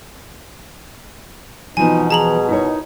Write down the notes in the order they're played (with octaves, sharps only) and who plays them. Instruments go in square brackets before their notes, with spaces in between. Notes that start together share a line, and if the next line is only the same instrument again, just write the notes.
[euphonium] B2 [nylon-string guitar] E3 F3 B3 [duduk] D#4 [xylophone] G#5
[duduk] G#4 [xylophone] A5 A#5 F#7
[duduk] D#4 [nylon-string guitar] E4 A#4 C#5